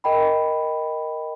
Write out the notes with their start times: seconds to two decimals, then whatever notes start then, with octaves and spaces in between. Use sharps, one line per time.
0.04 A#4 D#5 G5 B5